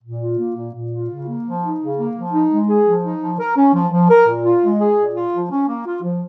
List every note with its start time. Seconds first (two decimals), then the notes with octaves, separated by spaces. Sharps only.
0.03 A#2
0.21 F4
0.38 A#3
0.56 A#2
0.74 A#2
0.92 F4
1.09 C#3
1.27 A#3
1.45 F3
1.63 D#4
1.80 C#3
1.97 A#3
2.15 F3
2.32 D#4
2.50 G#3
2.68 G#4
2.86 F3
3.04 D#4
3.21 F3
3.39 A#4
3.57 C#4
3.74 F3
3.92 F3
4.10 A#4
4.27 A#2
4.44 F4
4.63 G#3
4.80 G#4
4.97 A#2
5.15 F4
5.33 F3
5.51 C#4
5.68 A#3
5.86 F4
6.03 F3